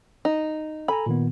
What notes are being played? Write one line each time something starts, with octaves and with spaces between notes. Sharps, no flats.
D#4
A4 G#5 A#5 B5
A#2 D#3 B3